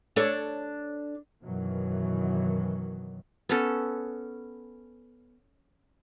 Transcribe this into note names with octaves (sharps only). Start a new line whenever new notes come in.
D4 A4 C#5
F#2 B2 D#3 E3 F#3
B3 C#4 A4